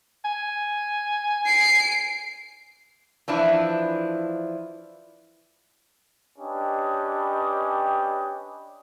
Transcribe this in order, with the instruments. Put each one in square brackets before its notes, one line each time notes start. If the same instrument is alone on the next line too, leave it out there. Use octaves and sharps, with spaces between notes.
[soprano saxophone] G#5
[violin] C7 D7
[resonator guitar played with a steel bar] E3 F3 D4 E4
[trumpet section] C#4 D4 G4 B4 D#5